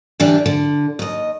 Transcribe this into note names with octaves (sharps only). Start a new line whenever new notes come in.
D3 E3 G3 D4
D3
D#2 D#5